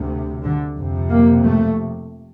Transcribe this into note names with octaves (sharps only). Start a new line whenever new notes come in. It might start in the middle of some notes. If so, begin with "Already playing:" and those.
Already playing: D2 C3
D3
F2 C3
A#3
A3